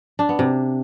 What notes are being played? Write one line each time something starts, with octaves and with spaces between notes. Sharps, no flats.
D4
B3
C3